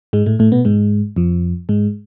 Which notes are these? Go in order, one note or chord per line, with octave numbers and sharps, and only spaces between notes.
G#2 G#3
A2 A3
A2 A3
B2 B3
G#2 G#3
F2 F3
G#2 G#3